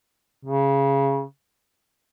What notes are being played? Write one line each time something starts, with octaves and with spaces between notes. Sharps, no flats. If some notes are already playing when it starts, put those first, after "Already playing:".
C#3